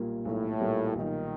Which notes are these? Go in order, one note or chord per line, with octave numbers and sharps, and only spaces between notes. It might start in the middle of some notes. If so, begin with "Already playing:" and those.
Already playing: B1 A#2 G3 A#3
B1 A2
A#2 G3 A#3
B1 D#3